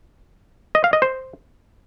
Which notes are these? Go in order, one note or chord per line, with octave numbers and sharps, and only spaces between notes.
D#5
F5
D#5
C5